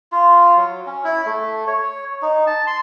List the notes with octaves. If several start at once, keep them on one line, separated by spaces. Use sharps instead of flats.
F4
F#3
C#4
E4
A3
C#5
D#4
A5
C6